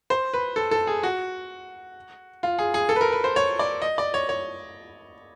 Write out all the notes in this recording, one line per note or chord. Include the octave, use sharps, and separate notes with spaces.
C5
B4
A4
A4
G#4
F#4
F4
G#4
G#4
A4
B4
A#4
B4
C5
C#5
D5
D#5
D5
C#5
C#5